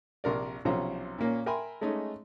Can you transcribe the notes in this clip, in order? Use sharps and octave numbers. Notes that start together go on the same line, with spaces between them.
A#1 C3 A#4 D5
B1 C3 F3 C#4 C5 A#5
A#2 A#3 C#4
A#4 E5 G5 G#5 B5 C6
G#3 A3 C#4 D#4